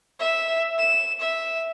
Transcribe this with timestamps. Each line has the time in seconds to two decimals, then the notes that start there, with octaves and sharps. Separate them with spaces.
0.19 E5
0.78 E7
1.20 E5